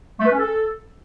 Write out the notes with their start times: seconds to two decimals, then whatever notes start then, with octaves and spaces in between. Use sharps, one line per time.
0.19 A3
0.26 B4
0.32 C#4
0.39 A4